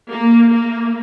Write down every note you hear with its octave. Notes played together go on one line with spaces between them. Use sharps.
A#3
A#3